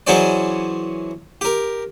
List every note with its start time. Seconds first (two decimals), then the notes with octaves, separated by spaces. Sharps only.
0.07 E3 F#3 C#4 G#4 C5 D5
1.41 G4 A#4